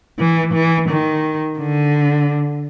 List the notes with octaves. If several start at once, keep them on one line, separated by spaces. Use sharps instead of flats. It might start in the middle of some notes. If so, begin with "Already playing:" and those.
E3
E3
D#3
D3